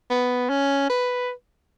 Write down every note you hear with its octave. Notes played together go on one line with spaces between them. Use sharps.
B3
C#4
B4